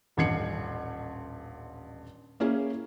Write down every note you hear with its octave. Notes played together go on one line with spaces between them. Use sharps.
D#1 A1 G2 G#6 C7 C#7
A#3 C#4 E4 G#4